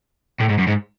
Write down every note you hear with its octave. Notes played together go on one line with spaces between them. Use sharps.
A2
G#2
F#2
G#2